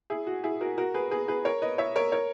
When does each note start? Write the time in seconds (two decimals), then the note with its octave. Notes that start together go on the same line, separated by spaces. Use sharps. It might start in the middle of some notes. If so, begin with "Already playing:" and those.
0.10 E4 G#4
0.27 F#4
0.44 E4 G#4
0.61 F#4 A#4
0.78 F#4 A#4
0.94 G#4 B4
1.11 G#4 B4
1.28 G#4 B4
1.45 A#4 C#5
1.62 B4 D#5
1.78 C#5 E5
1.96 A#4 C#5
2.12 A#4 C#5